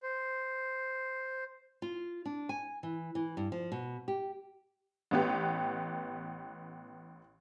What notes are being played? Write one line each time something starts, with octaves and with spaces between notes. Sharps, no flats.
C5
F4
D4
G#5
E3
E3
G2
F3
B2
G4
A1 B3 G4